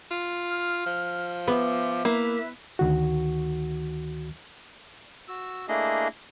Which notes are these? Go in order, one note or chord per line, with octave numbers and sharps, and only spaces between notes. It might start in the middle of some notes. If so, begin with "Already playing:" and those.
F4
F6
F3
B3 E5 G5 D6
A#3 E4 B4 E5
D2 D#3 F#4
F#4 E6
A3 A#3 D4 E4 G#4 D#5